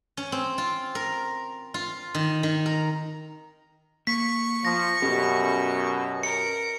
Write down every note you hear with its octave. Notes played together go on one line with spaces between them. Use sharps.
C#4
C4
F4
A#4
F4
D#3
D#3
A#4
A#3 C#6 B6
F3 A#6
F#2 B2 C#4 G4 A4
A#4 C#7